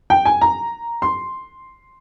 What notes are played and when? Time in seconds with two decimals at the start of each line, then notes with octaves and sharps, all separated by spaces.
0.10 G5
0.25 G#5
0.41 A#5
1.02 C6